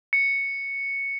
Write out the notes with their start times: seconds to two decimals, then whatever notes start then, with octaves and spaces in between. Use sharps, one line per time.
0.13 C#7